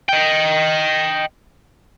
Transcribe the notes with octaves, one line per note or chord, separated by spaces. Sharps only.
D#5 G5